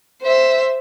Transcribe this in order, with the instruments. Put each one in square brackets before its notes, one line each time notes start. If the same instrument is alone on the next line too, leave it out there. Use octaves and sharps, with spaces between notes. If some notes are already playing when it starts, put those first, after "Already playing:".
[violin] C5 E5